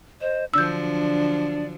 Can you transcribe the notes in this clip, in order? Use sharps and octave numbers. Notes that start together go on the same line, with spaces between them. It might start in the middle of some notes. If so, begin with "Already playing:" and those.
C5 D#5
D3 F3 F#3 D4 D5 E6 G6